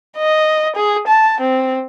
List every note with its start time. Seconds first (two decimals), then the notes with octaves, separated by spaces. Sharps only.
0.17 D#5
0.76 G#4
1.07 A5
1.40 C4